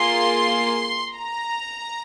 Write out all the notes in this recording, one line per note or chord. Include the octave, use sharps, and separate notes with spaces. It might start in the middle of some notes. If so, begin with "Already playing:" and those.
Already playing: A#3 F4 G#4 C6
A#5